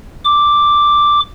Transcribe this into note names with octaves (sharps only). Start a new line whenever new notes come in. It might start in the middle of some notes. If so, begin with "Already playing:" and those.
D6